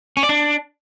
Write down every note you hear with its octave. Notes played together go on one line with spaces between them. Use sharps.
C#4
D5
D4